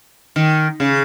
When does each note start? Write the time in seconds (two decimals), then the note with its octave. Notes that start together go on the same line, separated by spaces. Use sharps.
0.36 D#3
0.80 C#3